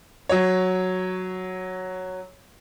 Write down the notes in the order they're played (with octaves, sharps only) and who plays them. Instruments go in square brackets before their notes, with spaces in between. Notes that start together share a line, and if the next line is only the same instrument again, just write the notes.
[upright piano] F#3 C#5